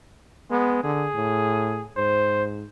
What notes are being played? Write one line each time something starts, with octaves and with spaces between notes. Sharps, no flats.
G#3 B3
D3 G#4
A2
G#2 C5